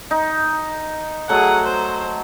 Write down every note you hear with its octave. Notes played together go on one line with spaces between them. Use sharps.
D#4
F#3 A3 G#4 F#5
C5